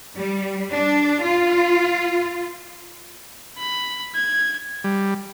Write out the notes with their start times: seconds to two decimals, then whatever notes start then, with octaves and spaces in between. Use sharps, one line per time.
0.16 G3
0.73 D4
1.24 F4
3.58 B5
4.15 G#6
4.84 G3